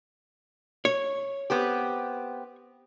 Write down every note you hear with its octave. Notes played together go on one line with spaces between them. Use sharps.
C#5
B3 C4 G4